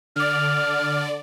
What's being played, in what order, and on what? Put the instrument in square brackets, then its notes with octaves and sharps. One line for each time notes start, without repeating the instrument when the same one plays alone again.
[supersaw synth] D3 D5 [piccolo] F6